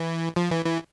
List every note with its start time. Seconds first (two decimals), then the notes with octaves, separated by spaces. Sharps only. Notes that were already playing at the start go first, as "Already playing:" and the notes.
Already playing: E3
0.36 F3
0.51 E3
0.65 E3